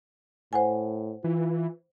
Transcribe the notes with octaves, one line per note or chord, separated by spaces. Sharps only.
A2 C5 F#5 G#5
E3 F4